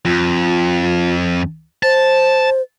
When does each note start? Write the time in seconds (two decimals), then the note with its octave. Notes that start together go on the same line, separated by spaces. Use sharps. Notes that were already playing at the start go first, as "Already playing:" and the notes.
0.05 F2 F4
1.83 C5 A5